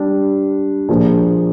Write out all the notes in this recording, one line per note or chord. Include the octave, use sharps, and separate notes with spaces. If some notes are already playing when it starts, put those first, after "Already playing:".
Already playing: G3 D4 G4
A#2 F3 A#3 D4 G#4